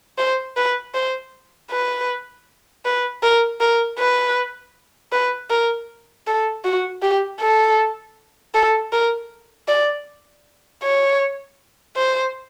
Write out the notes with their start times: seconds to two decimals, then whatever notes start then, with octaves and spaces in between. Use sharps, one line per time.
0.18 C5
0.57 B4
0.94 C5
1.70 B4
2.85 B4
3.23 A#4
3.60 A#4
3.99 B4
5.12 B4
5.50 A#4
6.27 A4
6.64 F#4
7.02 G4
7.40 A4
8.54 A4
8.92 A#4
9.68 D5
10.82 C#5
11.96 C5